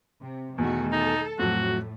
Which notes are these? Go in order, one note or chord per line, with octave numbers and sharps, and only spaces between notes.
C3
E2 B2 D#3 A3 F#4
D#4 A4
F2 A2 F#3 A3 F#4